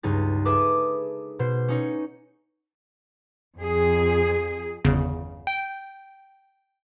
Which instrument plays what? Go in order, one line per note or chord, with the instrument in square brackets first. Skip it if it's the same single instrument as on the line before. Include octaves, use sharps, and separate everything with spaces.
[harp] C#2 G2 D#4 G#4 A6
G#4 A4 B4 E5 D6 D#6
B2 C5
C#4 D#4 C#5
[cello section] F2 G#4
[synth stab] G1 E2 C#3
G5